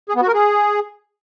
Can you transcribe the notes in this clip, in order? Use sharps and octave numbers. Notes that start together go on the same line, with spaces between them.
G#4
B3
F#4
A#4
G#4